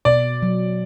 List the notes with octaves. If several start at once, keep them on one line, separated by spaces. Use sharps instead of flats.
B2 D5
F#3